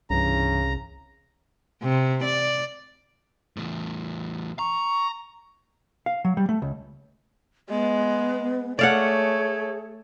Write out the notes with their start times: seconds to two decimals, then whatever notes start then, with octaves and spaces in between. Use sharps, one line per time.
0.10 C2 G2 C#3 E3 A#5
1.83 C3
2.25 D5
3.57 E2 A2
4.59 A#5 C#6
6.06 F5
6.25 F#3
6.37 G3
6.49 A3
6.62 C#2
7.69 G#3 B3
8.79 A3 G#4 C#5 D5 F5 F#5